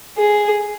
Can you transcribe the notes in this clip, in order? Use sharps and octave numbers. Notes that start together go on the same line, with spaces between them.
G#4